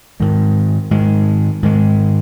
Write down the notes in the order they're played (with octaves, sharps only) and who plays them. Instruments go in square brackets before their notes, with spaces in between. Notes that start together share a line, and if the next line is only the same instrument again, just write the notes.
[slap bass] G#2 D#3 G#3
G#2 D#3 G#3
G#2 D#3 G#3